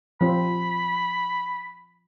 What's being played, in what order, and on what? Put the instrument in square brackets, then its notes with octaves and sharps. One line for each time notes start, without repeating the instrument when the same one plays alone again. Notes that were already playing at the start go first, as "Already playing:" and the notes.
[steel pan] F3 C4 [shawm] B5